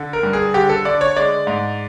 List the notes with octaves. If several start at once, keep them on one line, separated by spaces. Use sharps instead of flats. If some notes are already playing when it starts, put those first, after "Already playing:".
Already playing: D3
A#4
G2
G#4
D3 G4
A4
D3 D5
C#5
G#3 D5
G#2